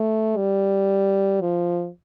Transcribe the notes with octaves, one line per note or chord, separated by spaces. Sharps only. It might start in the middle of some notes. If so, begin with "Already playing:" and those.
Already playing: A3
G3
F3